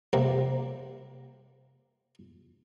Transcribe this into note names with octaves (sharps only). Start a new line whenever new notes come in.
C3 G3 A#3